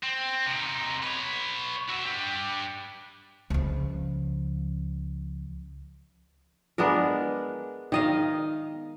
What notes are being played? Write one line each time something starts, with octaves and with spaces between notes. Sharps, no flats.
C4
C3 D#4
B4 C#5
F#4 E5
D4 G4
C#2 F3
G#3 B3 D4 A#4
D#3 D#5 F5